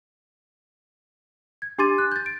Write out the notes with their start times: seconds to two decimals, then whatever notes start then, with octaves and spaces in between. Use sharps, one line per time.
1.62 G#6
1.78 D4 G4 C6 D6 A6 D#7
1.98 F#6
2.12 G6 A6
2.26 D7